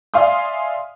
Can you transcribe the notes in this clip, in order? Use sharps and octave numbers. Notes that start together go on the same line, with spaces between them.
D5 E5 F5 G#5 C6 D#6